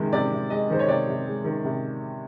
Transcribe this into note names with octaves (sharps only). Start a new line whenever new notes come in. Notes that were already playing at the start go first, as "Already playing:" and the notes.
Already playing: C3 D#3 G#3
C3 D5
C3
G#3 D#5
D#3 C5
C#5
C3 D5
C3
G#3
D#3
C3